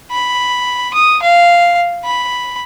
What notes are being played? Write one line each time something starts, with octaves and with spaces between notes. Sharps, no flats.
B5
D#6
F5
B5